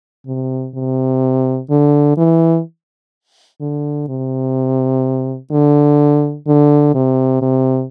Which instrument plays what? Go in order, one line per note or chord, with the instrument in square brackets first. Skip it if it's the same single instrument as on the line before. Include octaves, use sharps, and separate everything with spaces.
[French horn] C3
C3
D3
E3
D3
C3
D3
D3
C3
C3